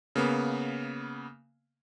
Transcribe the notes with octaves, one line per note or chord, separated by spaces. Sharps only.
C#3 A#3 B3